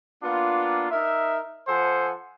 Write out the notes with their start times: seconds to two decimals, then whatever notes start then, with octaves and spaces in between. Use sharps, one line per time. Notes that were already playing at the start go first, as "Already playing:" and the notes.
0.23 A#3 B3 D4 F4
0.91 D#4 A#4 E5
1.68 F3 A4 C5 F#5 G#5